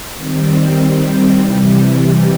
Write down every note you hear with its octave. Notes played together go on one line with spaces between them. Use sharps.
D#3 G3 C4
C3 E3 G3